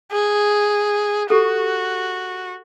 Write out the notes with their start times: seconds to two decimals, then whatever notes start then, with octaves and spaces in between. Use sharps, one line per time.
0.12 G#4
1.30 F#4 G4 A4